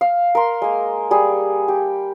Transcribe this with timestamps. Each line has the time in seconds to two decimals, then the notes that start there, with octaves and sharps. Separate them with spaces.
0.01 F5
0.35 A#4 C6
0.62 G#3 A#3
1.11 G3 G#4
1.68 G4